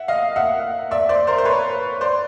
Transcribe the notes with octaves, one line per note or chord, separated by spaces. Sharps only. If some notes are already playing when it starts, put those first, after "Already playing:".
Already playing: E5 F#5
D#5 F5
E5 F#5
D5 E5
C5 D5
A#4 C5
C5
B4 C#5
C5 D5